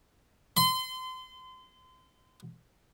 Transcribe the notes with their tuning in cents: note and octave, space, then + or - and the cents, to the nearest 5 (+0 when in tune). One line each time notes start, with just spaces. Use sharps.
C6 -30